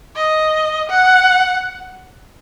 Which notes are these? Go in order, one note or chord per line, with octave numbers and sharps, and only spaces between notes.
D#5
F#5